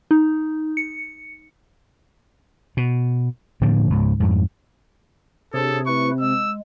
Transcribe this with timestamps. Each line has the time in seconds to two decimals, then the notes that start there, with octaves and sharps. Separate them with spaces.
0.11 D#4
0.77 C#7
2.77 B2
3.61 A2 D3 F3 A#3
3.90 C#2 G#2
4.20 F2 G#2
5.54 C3 D4 G#4 A4 C#5
5.86 A3 E4 B4 C#6
6.21 G#3 E6